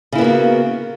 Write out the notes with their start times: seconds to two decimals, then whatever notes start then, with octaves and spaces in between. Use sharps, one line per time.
0.12 C#3
0.15 E4
0.18 B3
0.21 A#3
0.24 F#4